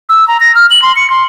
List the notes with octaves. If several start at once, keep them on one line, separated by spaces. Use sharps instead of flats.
E6
A#5
A#6
F6
F#7
C6
C#7
C6